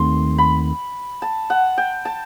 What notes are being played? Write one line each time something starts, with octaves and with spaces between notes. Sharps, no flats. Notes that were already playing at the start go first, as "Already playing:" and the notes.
Already playing: D#2 D#3 A3 C4 C6
B5
A5
F#5
G5
A5